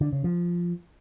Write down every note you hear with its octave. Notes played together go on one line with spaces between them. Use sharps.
D3
C#3
F3